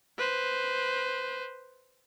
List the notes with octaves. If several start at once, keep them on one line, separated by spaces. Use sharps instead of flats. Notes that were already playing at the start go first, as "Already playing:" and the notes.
B4 C5